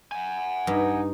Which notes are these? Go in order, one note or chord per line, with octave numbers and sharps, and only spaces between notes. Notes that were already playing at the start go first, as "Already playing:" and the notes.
F#5 G#5
G2 D#4